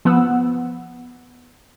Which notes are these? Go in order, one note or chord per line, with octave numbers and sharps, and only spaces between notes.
F3 B3 F#5 E6